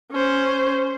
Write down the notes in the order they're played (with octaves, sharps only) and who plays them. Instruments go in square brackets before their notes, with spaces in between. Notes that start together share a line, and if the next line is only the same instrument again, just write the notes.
[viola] C#4 C5